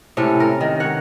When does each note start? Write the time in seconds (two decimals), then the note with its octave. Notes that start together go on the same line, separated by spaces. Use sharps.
0.17 A2 C3 C#4 A4
0.40 A#4
0.61 D#3
0.80 C#5 F#5